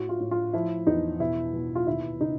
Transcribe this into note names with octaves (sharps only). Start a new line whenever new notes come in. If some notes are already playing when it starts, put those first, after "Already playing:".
Already playing: A2 F#4
F4
A2
F4
F3 E4
E2 D#4
B2 E4
B2
F4
D#2 E4
C#3 D#4